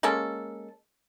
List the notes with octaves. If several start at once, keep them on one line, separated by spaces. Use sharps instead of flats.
G#3 A#3 C#4 A4